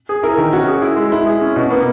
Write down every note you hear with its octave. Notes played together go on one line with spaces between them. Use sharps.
G#4
E4 A#4
D#3 A#4
C#4 F#4
G#4
E4
G#3
G#3 E4
G#4
C#4
B2
A#3 B3